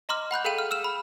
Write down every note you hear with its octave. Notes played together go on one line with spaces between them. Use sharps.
D#5 A#5 C6 D6 F6
F#5 B5 F#6 G6
G#4 A4 F5 G5 D#7 F#7
F6
E6 F6 E7
B5